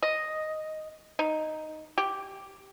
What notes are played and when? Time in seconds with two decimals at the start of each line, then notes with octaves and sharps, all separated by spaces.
0.03 D#5
1.19 D#4
1.98 G4